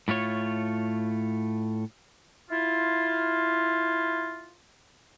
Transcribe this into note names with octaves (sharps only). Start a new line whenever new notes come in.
A2 A3 F4 C#5
E4 F4